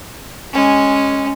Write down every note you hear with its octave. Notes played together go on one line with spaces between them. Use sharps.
G#3 C#4